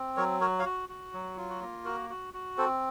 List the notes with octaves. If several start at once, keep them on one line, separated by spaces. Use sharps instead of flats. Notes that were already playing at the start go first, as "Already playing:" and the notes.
Already playing: C4
F#3 A#4 C#5
F#4 A#4 C#5
C#5 F5
F#4
F#4
F#3
F4
F#4
A#3
F#4 A#4
F#4
F#4
C4 A4 C5